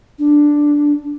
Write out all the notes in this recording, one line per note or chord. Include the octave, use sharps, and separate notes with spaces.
D4